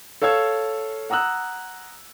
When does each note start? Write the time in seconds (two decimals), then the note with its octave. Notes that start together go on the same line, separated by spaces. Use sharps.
0.22 A4 C#5 F5 E6 G#6
1.10 F#5 A#5 D#6 E6 F#6